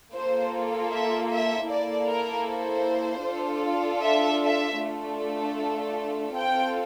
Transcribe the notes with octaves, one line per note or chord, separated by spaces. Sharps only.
A#3 F4 A4 C5
E5
E5
A#3 E4 A4 D5
A#4
C5
D4 F4 A4
E5
E5
A3 D4 F4 A4
C4 F4 A4 G5